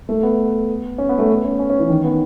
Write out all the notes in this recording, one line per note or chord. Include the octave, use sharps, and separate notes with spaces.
A3
B3
C#4
B3
A3
B3
C#4
C#4
C#4
E3
D#3
B3